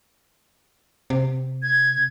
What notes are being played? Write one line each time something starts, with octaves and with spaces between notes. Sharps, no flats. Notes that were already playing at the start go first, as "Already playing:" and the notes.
C3
G#6